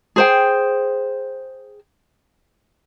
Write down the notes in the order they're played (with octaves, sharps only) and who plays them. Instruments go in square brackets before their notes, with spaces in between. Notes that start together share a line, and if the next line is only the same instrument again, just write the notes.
[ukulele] G#4 C5 G5